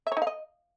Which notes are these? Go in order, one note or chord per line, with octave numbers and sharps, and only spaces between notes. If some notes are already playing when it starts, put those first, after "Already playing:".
E5
C#5
D#4
F5
D#5